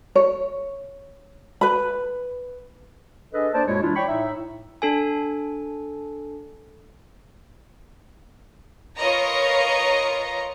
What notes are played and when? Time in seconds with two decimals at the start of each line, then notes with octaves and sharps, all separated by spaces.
0.15 C#5
1.61 B4 B5
3.34 D4 G#4 A4 B4 D#5
3.54 A#3 D4 C5 D5 A5
3.68 F#2 A#2 G#3 E4 F#4 C#5
3.83 E3 G#3 D4 E4 F4
3.96 C#5 D5 G5 B5 C#6
4.09 A2 D#4 E5
4.82 D4 A4 G#5
8.97 F4 A#4 B4 C#5 D#5 A#5